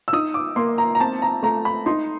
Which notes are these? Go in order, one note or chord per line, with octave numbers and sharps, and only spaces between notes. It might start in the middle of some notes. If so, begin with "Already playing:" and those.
E6
D#4 D#6
D6
A#3 C6
A#5
A#5
C4 A5
A#5
A3 A#5
B5
D#4 C6